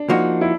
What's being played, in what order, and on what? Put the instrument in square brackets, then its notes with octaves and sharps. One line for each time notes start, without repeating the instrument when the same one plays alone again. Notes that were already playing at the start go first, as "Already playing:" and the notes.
Already playing: [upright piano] D4
[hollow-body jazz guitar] F3 A#3 D#4 F#4
[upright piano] E4